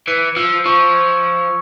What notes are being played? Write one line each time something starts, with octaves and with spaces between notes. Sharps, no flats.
E3 C#7
F3 E6
F3 C#6
G#6